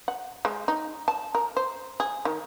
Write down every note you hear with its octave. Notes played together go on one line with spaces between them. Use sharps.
F#5
G#3
D#4
A5
A#4
C5
G#4
D#3